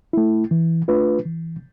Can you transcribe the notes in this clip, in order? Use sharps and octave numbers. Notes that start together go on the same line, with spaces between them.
A3 E4
E3
A3 D4 F4 B4
E3